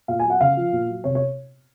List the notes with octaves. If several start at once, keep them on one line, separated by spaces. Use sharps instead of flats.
A#2 F5
G#5
F#3
F#5
C#3 F5
F3
A#2
F#3
C3 C#5
C#5